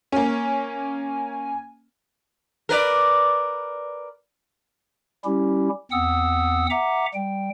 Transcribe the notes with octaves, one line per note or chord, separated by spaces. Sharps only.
A#3 C#4 G#5
A#4 B4 D5
G3 C#4 E4 G4
E2 C4 F#5 D#6 E6
E5 F#5 A#5 D6
G3 G5